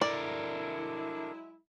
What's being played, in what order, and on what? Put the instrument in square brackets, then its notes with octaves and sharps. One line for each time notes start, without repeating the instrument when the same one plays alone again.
[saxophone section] F#3 G#3 E4 [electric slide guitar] D4 A4 A#4 [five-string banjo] D5